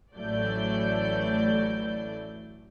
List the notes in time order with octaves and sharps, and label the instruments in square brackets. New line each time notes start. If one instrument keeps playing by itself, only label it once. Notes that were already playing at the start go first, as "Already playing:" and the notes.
[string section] A1 E3 F#3 A3 D5 G6